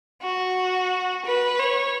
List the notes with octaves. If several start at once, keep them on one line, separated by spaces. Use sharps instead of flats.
F#4
B4
C#5